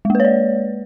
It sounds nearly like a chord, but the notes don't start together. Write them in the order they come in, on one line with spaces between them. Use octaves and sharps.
G#3 A#3 B4 C#5 D5